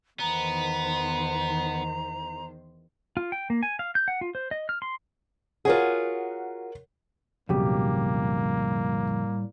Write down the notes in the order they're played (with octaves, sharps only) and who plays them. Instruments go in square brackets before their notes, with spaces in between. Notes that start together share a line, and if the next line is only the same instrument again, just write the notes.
[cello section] E2 D#3 C5 [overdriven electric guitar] B3 [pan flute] A#5
[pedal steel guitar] F4
G5
A#3
G#5
F5
G6
F#5
F4
C5
D#5
F6
C6
[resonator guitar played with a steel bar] F4 F#4 G#4 [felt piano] A#4 C#5 F#5
[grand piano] B1 G4 [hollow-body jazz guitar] F2 C#3 [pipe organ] A2 G3 [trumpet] A#3